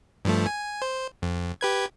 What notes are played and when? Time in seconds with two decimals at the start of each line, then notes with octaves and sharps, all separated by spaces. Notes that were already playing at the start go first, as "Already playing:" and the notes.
0.25 G2 F3 A3
0.46 G#5
0.82 C5
1.22 F2
1.61 G4 B4 G#6